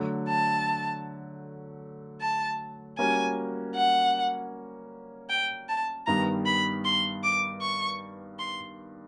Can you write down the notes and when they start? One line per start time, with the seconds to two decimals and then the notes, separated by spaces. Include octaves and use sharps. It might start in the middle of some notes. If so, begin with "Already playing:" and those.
Already playing: D3 F#3 A3
0.28 A5
2.21 A5
2.98 G3 A#3 C#4 F#4 G#5
3.75 F#5
5.29 G5
5.68 A5
6.07 G2 D#3 G3 B3 A#5
6.46 B5
6.85 C6
7.23 D6
7.61 C#6
8.39 C6